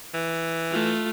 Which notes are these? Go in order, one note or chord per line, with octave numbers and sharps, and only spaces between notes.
E3
A3 F4